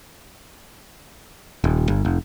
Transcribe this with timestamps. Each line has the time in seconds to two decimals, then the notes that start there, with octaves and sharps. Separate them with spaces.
1.64 D#1
1.89 G1
2.05 F1